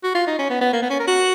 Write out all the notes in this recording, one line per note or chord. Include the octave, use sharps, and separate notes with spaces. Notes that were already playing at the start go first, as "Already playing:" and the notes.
F#4
F4
D#4
C#4
B3
B3
A#3
B3
C#4
A#4
F#4